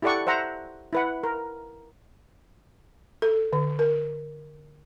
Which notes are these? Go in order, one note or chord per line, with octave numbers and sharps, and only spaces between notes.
E4 G4 A4 D5 F#5 C#6
C5 E5 F#5 A#5
E4 B4 F#5
A#4
A4
D3
A#4